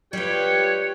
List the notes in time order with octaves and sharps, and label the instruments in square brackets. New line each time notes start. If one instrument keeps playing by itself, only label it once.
[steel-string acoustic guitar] G3 F4 [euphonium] G4 [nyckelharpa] B4 G5 [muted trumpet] C#5